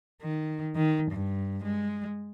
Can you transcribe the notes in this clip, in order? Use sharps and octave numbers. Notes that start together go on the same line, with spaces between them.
D#3
D#3
G2
G#3